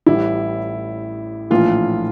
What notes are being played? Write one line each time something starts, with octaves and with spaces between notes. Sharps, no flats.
A1 A2 G3 E4
A#1 A2 E3 F4